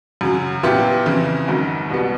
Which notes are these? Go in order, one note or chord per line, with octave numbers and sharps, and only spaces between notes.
F#2 C#3 F#3
A#2 F#3 B3 E4 G4
F2 C#3 E3
G#1 G#2 D#3 F#3
C2 B2 G3 B3